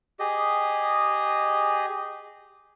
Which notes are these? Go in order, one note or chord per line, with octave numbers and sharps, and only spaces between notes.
G4 G#4 D#5